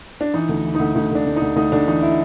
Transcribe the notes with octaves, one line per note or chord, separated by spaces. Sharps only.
D4
E3 D#4
D2
E3
D2 D#4
D2 D#4
D2 D4
D2
D#4
D2
D2 D#4
D2 D4
E3 D#4
E4